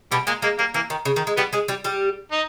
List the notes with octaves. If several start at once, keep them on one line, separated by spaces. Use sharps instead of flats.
B2 G3 B3
A#2 G#3 A#3
G#3 A#3
G3 A#3
E3 A#3
D#3
C#3
D#3
G#3
G3 B3 G4
G#3 G#4
G3 G4
G3 G4
D#4